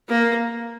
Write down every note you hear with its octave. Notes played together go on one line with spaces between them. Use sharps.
A#3